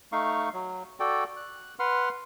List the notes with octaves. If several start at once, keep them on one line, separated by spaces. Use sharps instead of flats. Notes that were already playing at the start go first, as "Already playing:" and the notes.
A3 D#4 F5 C#6
F#3
F#4 A4 D5 G5
F#6
B4 F#5 C6 F6